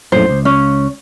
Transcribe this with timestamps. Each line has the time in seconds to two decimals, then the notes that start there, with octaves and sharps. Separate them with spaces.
0.12 A#1 F#2 A2 C5
0.29 C#2
0.45 C#4